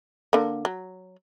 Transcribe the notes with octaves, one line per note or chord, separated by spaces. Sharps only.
D3 A#3
F#3